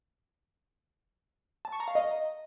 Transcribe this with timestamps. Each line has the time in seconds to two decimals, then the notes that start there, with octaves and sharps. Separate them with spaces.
1.65 A5
1.72 C#6
1.80 A#5
1.88 F5
1.95 D#5